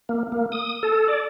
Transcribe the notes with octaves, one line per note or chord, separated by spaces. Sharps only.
A#3
A#3
D#6
A4
D5